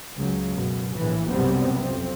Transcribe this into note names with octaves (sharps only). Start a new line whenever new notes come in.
C#2 F#3
F#2 B2
A#1 A2 E3
B1 F#2 C3 G3 B3 C4
F2 C4